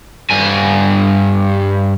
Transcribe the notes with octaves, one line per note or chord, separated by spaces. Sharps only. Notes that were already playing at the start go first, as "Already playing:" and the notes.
G2 G#5